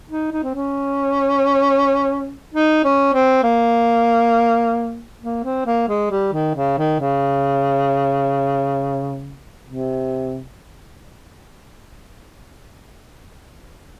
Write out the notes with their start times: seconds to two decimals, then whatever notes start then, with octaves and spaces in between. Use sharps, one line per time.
0.10 D#4
0.32 D#4
0.44 C4
0.54 C#4
2.54 D#4
2.84 C#4
3.13 C4
3.43 A#3
5.22 A#3
5.44 C4
5.66 A#3
5.88 G#3
6.10 G3
6.33 D#3
6.55 C#3
6.77 D#3
7.00 C#3
9.66 C3